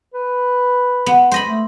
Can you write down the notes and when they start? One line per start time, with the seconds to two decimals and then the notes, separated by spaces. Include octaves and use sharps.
0.14 B4
1.06 B3
1.31 G#3 C5 D#5 B5
1.45 A3